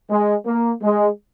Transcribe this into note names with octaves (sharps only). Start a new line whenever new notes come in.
G#3
A#3
G#3